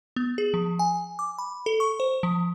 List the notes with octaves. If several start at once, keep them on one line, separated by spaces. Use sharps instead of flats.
B3
G#4
F3
G#5
D6
B5
A4
C#6
C5
F3